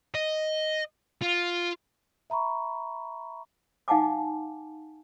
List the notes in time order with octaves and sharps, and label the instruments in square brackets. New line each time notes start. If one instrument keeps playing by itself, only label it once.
[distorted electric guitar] D#5
F4
[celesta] E5 A#5 B5 C#6
[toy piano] D#4 F5 F#5 G#5 A5 D6